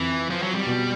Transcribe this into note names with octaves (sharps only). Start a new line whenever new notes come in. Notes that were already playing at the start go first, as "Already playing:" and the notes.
Already playing: F2 E3
F3
F#3
G3
B2